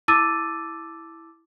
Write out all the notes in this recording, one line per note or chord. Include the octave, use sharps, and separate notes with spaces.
E4 A5 D6 E6 A6 D#7